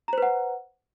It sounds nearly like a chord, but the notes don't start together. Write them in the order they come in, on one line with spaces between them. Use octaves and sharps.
A#5 C5 B4 F#5